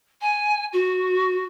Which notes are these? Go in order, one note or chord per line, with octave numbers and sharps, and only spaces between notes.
G#5
F#4